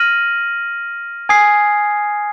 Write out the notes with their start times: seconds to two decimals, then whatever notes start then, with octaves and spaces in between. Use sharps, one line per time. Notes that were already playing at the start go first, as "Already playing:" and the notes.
Already playing: F6 A#6 D#7 F#7
1.29 G#5 D#6 G#6 C7